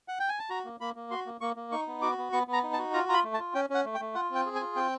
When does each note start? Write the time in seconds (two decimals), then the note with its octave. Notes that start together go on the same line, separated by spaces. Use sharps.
0.08 F#5
0.19 G5
0.29 G#5
0.39 A5
0.50 F#4 A#5
0.65 A#3
0.80 A#3 B5
0.96 A#3
1.11 F#4 C6
1.26 A#3
1.41 A#3 C#6
1.56 A#3
1.72 D#4 C#6
1.87 B3
2.02 F#4 D6
2.18 B3
2.33 B3 C#6
2.47 B3
2.53 A#5
2.63 D#4
2.73 A5
2.78 F#4
2.93 F4 A#5
3.09 F4 A#5
3.14 B5
3.24 A3
3.34 A5
3.39 F4
3.54 C#4 G5
3.70 C#4 F#5
3.85 A3
3.95 G5
4.00 A3
4.15 F4 F#5
4.30 C4 G5
4.46 G#4
4.55 G#5
4.61 F4
4.76 C4 G5